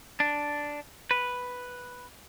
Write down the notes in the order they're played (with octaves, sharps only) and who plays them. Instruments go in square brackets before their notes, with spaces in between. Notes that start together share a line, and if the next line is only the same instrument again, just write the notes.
[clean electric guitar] D4
B4